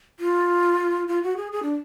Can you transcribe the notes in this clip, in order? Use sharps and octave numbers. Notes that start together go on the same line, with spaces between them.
F4
F4
F#4
G#4
G#4
D4